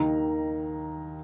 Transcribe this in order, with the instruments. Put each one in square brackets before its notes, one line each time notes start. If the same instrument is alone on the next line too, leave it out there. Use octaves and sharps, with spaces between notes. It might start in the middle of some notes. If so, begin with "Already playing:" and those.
Already playing: [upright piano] D#2 D#3 A#5